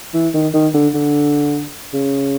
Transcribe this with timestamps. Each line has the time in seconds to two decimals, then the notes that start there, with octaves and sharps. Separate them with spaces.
0.14 E3
0.34 D#3
0.54 D#3
0.74 D3
0.94 D3
1.93 C#3